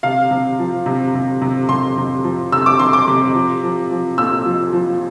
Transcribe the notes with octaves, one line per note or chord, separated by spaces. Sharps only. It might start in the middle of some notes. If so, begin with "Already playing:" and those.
C3 F5
C3
F3
C3
C3
C3
C3 C6
C3
F3
C3 E6
D6
C3 C6
D6
C3
F3
F3
F3
A#2 E6
F3
F3